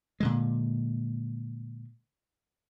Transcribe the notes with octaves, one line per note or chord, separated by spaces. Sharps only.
A#2 D3 G#3